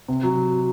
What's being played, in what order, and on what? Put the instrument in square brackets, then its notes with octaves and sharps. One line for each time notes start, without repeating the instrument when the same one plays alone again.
[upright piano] C3
F#3